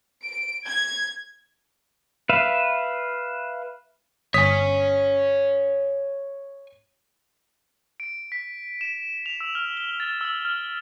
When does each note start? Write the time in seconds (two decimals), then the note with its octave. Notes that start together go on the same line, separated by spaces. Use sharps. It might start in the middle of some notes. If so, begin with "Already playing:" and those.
0.23 D7
0.67 G#6
2.29 B4 E5 F5
4.34 G1 C#5 G#5 D#6 B6
8.00 D7
8.32 B6
8.81 E7
9.26 F7
9.41 E6
9.55 F6
9.77 G7
10.00 A6
10.21 E6
10.45 F6